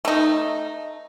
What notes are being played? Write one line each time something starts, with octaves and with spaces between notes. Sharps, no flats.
A3 D#4